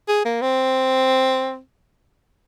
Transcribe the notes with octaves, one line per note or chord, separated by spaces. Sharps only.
G#4
A#3
C4